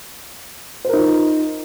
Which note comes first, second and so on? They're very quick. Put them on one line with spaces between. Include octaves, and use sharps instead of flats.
C5 A#4 D#4 F4